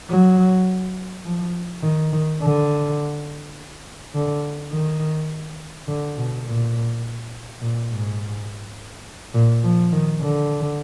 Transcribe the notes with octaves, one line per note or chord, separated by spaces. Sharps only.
F#3
F3
D#3
D#3
D3
D3
D#3
D3
B2
A#2
A#2
G#2
A#2
F3
D#3
D3